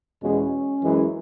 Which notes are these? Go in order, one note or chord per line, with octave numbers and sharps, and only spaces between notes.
E2 B2 G#3 C#4
F#2 E3 G#3